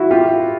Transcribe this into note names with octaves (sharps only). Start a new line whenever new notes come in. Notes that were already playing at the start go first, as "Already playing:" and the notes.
Already playing: E4 F#4
F4 G4